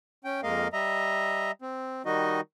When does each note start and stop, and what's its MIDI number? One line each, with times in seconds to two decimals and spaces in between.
0.25 0.41 61
0.25 0.41 79
0.43 0.68 41
0.43 0.68 56
0.43 0.68 58
0.43 0.68 70
0.43 0.68 75
0.43 0.68 77
0.73 1.51 55
0.73 1.51 75
0.73 1.51 76
0.73 1.51 82
1.62 2.02 60
2.06 2.41 51
2.06 2.41 55
2.06 2.41 63
2.06 2.41 66
2.06 2.41 75